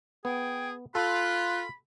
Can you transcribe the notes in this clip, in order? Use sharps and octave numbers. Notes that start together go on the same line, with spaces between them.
B3 G#4 G5
F4 A4 B5 F#6